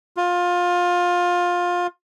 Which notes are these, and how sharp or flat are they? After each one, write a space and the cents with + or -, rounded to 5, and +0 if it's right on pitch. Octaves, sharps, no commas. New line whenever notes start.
F4 +20